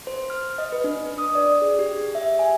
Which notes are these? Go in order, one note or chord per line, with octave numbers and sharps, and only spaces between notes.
C5
F6
D#5
B4
D4
D#6
D5
G#4
G4
E5
G#5